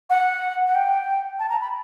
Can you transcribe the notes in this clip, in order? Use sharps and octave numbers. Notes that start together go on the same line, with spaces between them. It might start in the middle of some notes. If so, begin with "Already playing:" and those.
F#5
F#5
G5
A5
A#5
B5